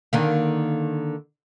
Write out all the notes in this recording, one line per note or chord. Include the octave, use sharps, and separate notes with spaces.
D3 D#3 A#3